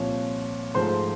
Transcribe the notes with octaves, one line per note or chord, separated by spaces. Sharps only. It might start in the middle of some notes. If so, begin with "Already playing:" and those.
Already playing: C2 A#2 F3 C#5
G#2 F3 A3 C5 C6